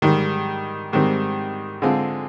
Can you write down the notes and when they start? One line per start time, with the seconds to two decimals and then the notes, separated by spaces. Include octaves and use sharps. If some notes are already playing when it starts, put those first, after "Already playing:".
0.02 G#2 D#3 G3
0.93 G#2 D#3 G3 C4
1.82 D3 G#3 C4 F4